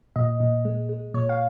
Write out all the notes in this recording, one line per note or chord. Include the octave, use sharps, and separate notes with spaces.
A#2 D#5
A#2
G#3
G#3
A#2 C#5
F5